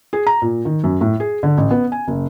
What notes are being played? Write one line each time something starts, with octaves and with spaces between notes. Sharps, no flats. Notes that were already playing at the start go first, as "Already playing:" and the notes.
G#4
A#5
A#2
D#3
F#2
A2
G#4
D3
A1
B3
G#5
F#1